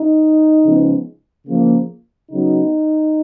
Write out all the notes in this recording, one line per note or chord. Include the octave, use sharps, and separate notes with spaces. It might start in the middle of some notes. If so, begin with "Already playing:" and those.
Already playing: D#4
C#3 F3 G#3 B3
C#3 F3 A#3
C#3 F#3 B3 D#4